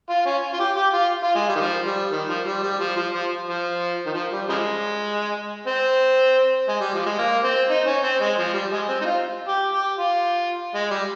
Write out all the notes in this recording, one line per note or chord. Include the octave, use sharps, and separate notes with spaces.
F4
C#4
F4
G4
G4
F4
F4
G#3
G3
D#3
F3
G3
D#3
F3
G3
G3
F3
F3
F3
F3
D#3
F3
G3
C#3 F3 G#3
C4
G#3
G3
F3
G#3
A#3
C4
D#4
C#4
C4
G#3
F3
G3
G#3
C4
D#4
F4
G4
G4
F4
G#3
G3